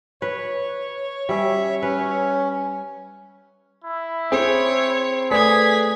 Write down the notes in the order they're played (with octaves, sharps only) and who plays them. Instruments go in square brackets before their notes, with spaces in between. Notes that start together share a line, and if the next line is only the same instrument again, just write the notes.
[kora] B4 [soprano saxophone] C#5
[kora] G3 C#4 [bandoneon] E5
[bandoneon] C#4 [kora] B4
[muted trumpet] E4
[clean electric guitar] C4 [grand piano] G#4 [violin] C#5
[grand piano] A3 B4 D5 [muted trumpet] G#4 [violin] G#6 B6